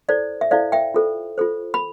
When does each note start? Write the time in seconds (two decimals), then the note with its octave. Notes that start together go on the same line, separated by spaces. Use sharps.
0.08 E4 A4 C5 D5
0.41 E5
0.51 E4 A4 C5 D5 F5
0.72 E5 G5
0.94 F4 A4 C5
1.38 F4 A4 C5
1.74 B5